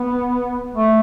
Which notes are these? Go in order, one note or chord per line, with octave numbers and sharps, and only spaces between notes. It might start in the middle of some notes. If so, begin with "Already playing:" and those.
Already playing: B3
A3